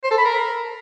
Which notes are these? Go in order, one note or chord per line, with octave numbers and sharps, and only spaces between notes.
C5
A4
B5
A#4